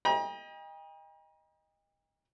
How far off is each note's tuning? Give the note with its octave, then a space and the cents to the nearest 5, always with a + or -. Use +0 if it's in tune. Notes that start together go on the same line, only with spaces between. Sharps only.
D#5 +0 G5 +40 A#5 +40